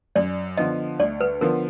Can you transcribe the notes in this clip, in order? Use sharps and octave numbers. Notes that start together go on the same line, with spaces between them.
F#2 D5
D3 F3 B3 D#5
D2 D5
B4
D3 F3 B3 A#4